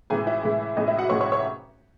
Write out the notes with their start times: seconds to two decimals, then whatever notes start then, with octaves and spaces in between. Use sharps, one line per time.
0.10 A2 E3 G#3 G#4 G#5
0.27 E4 E5
0.43 A2 E3 G#3
0.77 A2 E3 G#3 D#5
0.88 E4 E5
0.98 F#4 F#5
1.09 A2 E3 G#3 C#5 C#6
1.21 C#5 C#6
1.32 C#5 C#6